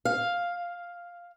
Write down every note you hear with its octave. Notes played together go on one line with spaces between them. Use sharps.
F5